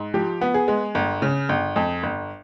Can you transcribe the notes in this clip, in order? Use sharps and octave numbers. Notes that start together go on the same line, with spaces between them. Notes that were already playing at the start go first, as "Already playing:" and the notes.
Already playing: G#2
F3 G4
B3
G#4
G#3
G1
C#3
G1
F2
G1